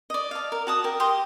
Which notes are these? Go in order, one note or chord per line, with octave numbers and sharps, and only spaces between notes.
D5 D#5
F5 A5
A#4
F#4 A5 D#6
A#4 G5
G4 C6 D#6